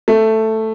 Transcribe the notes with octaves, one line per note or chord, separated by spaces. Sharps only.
A3